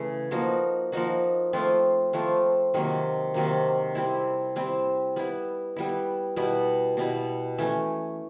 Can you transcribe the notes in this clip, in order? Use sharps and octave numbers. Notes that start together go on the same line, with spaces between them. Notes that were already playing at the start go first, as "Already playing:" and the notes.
Already playing: C#3 E3 A3
F3 A#3 D#4 F#4
F3 A#3 D#4 F#4
F3 A3 C4 F4
F3 A3 C4 F4
C3 D#3 F#3 A#3
C3 D#3 F#3 A#3
G3 C4 E4
G3 C4 E4
G3 B3 E4
G3 B3 E4
B2 G3 B3 E4
B2 G3 B3 E4
E3 A3 C#4